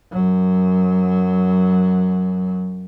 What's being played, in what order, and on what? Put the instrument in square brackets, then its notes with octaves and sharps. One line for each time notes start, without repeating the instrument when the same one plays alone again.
[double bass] F#2 F#3